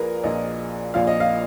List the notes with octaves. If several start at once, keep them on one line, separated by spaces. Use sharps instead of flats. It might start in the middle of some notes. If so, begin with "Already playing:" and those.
Already playing: A#1 A#2 F3 G#4 A#4 B4
A#1 A#2 F3 D#5
A#1 A#2 F3 F5
D#5
F5